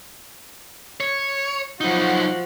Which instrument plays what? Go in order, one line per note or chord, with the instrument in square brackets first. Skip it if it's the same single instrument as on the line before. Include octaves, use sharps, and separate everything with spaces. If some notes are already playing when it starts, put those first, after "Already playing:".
[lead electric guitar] C#5
[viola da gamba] F3 F#4 [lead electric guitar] F#3 D#4